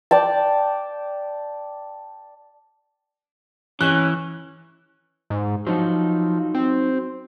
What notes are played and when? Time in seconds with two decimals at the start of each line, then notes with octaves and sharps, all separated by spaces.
0.11 D5 G5 A5
3.81 E3 C#4 F#6
5.30 G#2
5.67 F3 F#3 D#4 F#4
6.55 C4